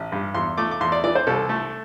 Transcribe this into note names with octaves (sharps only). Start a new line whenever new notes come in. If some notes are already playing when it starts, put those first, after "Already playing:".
Already playing: A1
G2
E2 C6
A3 D6
D6
E2 C6
D5
E3 D5
C5
C2 A4
A3